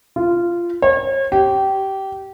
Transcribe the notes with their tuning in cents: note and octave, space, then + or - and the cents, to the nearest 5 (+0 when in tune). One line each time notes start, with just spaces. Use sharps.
F4 -15
C#5 -40
G4 -20